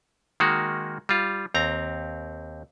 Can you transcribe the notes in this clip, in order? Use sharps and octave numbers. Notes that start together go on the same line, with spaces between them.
D#3 G#3 A#3 F#4
G3 F4
D#2 C4 A#5